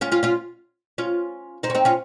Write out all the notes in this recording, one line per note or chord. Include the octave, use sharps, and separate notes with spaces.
C#4 F4
C#4 F4
C#4 F4
C#4 F4
C4 D#4
C#4
C4 D#4
C#4 F4